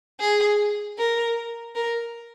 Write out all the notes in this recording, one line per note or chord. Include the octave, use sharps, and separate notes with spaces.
G#4
A#4
A#4